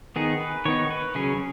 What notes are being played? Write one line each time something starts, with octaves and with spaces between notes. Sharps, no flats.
D#3 B3 D#4 G#4
B4
D#3 B3 D#4 C#5
B4
C#3 F#3 C#4 G#4